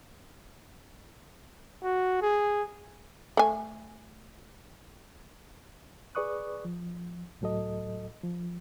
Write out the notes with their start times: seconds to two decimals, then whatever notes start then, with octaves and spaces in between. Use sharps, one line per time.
1.83 F#4
2.22 G#4
3.37 A3 G#5
6.15 G#4 B4 D5 C#6 D#6 F#6
6.65 F3
7.41 C#2 A2 F#3 A4 D#5
8.23 F3